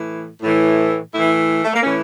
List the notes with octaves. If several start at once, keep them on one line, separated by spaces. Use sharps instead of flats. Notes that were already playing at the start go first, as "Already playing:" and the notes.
Already playing: A2 E3
A2 E3
A2 E3 E4
A3
A#3
A2 E3 C#4